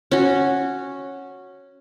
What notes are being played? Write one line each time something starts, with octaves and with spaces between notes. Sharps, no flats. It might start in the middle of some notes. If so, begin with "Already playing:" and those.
C#4 F#4